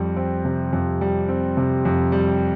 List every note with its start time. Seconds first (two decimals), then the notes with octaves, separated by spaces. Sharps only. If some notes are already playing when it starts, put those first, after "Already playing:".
Already playing: F2 G3
0.17 C4
0.45 C3
0.73 F2
1.01 G3
1.29 C4
1.57 C3
1.85 F2
2.12 G3